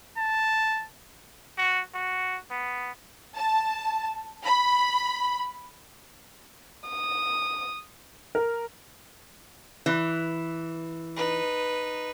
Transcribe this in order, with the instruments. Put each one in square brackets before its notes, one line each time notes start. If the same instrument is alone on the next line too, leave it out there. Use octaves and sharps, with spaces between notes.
[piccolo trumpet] A5
[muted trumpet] F#4
F#4
B3
[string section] A5
B5
[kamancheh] D#6
[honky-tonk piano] A#4
[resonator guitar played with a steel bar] E3
[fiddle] D#4 B4